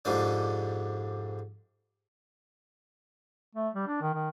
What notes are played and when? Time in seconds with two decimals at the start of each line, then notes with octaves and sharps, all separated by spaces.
0.05 F2 G#2 C3 D4
3.55 A3
3.74 G3
3.87 D4
4.01 D#3
4.14 D#3